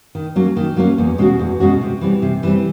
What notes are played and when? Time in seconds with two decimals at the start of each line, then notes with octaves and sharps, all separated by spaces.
0.15 D#3
0.36 F#3 A#3 C#4
0.57 D#3
0.77 F#3 A#3 C#4
0.98 E2
1.18 B2 G#3 C#4 F#4
1.39 E2
1.60 B2 G#3 C#4 F#4
1.81 C3
2.01 E3 G3 C4
2.22 C3
2.43 E3 G3 C4